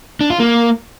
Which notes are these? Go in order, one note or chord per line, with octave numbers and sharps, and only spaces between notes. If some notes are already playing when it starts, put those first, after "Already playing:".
D4
F4
A#3